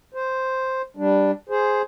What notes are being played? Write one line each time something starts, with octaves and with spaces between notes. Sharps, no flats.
C5
G3 D4
G#4 C5